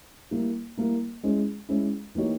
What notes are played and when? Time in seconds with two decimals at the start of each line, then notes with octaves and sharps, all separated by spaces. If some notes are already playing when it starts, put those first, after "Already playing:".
0.31 G3 A#3 E4
0.77 G3 A#3 E4
1.23 G#3 C#4 E4 G#4
1.69 G#3 C#4 E4 G#4
2.15 E3 A#3 D#4 G4 C#5